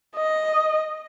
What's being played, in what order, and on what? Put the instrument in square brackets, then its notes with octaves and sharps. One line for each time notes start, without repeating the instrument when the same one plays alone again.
[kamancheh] D#5